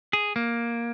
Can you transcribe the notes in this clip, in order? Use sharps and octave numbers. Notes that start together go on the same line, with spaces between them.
G#4
A#3